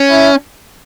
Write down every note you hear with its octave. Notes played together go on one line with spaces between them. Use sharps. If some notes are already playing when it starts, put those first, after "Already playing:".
Already playing: C#4
E4